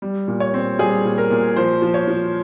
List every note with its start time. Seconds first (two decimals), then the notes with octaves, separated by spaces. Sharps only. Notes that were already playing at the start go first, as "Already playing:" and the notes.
0.02 G3
0.28 A#2
0.40 C#5
0.54 C4
0.79 G3 G#4
1.05 A#2
1.18 A#4
1.30 A#2
1.56 F3 C5
1.82 F3
1.94 C#5
2.08 F3